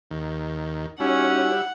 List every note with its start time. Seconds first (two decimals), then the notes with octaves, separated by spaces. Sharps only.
0.11 D#2
1.00 G3 C#4 D#4 E4 F#4 C#5 F#5